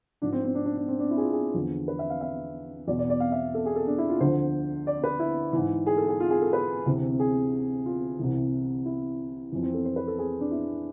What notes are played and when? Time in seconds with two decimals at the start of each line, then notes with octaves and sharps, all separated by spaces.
0.22 G#2 F3 D4
0.33 C4
0.44 C4
0.55 D4
0.65 D4
0.77 D4
0.88 C4
0.99 D4
1.11 E4
1.17 G#4
1.21 F4
1.33 G#4
1.54 E2 D3 F3
1.88 B4
1.99 E5
2.10 F5
2.21 E5
2.88 E2 B2 D5
2.99 D5
3.10 D5
3.20 F5
3.32 E5
3.54 A4
3.66 G#4
3.76 A4
3.87 D4
3.98 E4
4.09 F4
4.20 D2 D3 F3 C5
4.87 D5
5.04 B4
5.19 E4
5.53 G#2 E3
5.86 G#4
5.97 A4
6.08 G#4
6.20 F4
6.30 G#4
6.42 A4
6.53 B4
6.86 D2 C3 E3
7.20 G#4
7.86 F4
8.19 C2 C3 E3
8.85 E4
9.52 F2 E3
9.63 C4
9.74 A4
9.85 C5
9.96 B4
10.07 A4
10.19 G#4
10.40 D4
10.51 E4